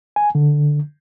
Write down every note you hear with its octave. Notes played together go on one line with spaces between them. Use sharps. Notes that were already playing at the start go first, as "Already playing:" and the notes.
G#5
D3